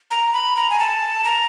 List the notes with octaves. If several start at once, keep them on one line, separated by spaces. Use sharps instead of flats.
A#5
B5
A#5
G#5
A5
A#5